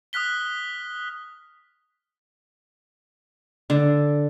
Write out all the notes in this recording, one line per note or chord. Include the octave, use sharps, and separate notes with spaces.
D#6 F6 F#6 B6 G7
D3